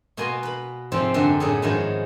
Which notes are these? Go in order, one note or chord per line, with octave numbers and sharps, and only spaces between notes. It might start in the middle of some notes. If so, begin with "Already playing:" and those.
B2 A#3 F#4 G#5 C6
B4 B5
G#2 C3 F3 C4 E5
F#2 D3 C4 A4
F#2 A2 C#4 D#4 G#4 A4
G#2 D#3 F3 C#4 E4 F#4